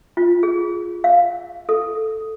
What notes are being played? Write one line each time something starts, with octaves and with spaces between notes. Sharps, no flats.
F4
G#4
F5
A4